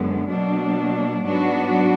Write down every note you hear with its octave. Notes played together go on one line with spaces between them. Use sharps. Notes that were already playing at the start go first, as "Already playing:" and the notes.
Already playing: F#2 D3 G#3 B3
B2 F#3 A#3 D4
G#2 F#3 B3 D4 F#4